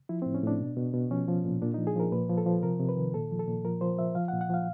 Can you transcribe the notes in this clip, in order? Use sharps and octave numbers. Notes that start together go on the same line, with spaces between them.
F3 E4
C4
A2
C#4
A2 D4
B2
B2
B2
F3 C#4
F3
A#2
A#2 D4
D#4
F3
G#4
F3 A#4
A#2 B4
F3
A4
F3
C3 A#4
C3
B4
D#3
A#2 A4
F3
A4
A#2
F3 A#4
F3 C5
F3 E5
F3 F5
F#5
A#2
F#5
F3 F5